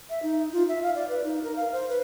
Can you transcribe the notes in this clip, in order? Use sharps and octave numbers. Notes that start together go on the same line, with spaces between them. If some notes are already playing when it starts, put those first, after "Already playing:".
E5
D#4
F4
E5
F5
D5
B4
D#4
A#4
F5
C5
B4